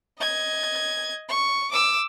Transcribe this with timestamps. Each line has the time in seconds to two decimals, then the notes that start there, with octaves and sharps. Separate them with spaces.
0.19 D#5 G#6
1.29 C#6
1.71 D6 E6